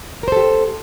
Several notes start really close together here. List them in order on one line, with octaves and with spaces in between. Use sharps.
A#4 C5 A4 G4